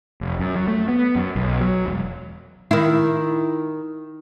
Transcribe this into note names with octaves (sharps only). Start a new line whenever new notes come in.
F1
F#2
F#3
A3
B3
F#2
B1
F#3
E1
D#3 E4